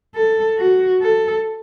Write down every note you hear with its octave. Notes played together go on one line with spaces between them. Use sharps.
A4
F#4
A4